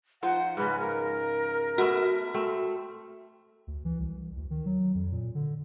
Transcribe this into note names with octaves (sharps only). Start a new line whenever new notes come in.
F3 D#4 C5 F#5
G#2 C#3 B4
A#4
A3 B3 F#4
A3 C4
D2
E3
C2
D2
D#3
F#3
F2
A#2
D3